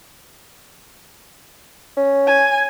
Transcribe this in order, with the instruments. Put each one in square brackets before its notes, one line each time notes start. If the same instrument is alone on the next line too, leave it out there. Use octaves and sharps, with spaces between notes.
[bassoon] C#4
[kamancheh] G#5